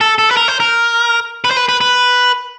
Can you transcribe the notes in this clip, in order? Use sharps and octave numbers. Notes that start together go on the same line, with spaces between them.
A4
A4
B4
A#4
C5
A#4
B4
C5
B4
B4
B4